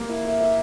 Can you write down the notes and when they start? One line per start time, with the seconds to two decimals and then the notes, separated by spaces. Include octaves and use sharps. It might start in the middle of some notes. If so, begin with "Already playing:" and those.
Already playing: A#3
0.09 E4
0.25 E5
0.40 E5